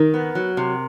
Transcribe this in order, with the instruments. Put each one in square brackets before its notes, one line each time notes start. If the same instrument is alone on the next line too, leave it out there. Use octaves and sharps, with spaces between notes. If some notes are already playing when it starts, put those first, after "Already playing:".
Already playing: [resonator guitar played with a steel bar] D#3 [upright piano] A#4
[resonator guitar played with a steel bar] B3
F#3
C3